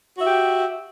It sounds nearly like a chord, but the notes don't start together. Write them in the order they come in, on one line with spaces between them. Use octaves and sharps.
F#4 E5 G4